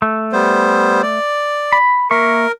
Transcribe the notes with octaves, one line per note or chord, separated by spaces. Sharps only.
A3
G3 B3 C5
D5
B5
A#3 A#4 E5 C#6